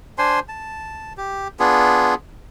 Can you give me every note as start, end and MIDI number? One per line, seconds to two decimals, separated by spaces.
0.18 0.40 62
0.18 0.40 72
0.18 0.40 80
0.18 0.40 84
0.49 1.13 81
1.17 1.48 67
1.60 2.14 59
1.60 2.14 62
1.60 2.14 65
1.60 2.14 68